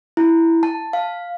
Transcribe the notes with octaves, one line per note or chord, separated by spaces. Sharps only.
E4
A5
F5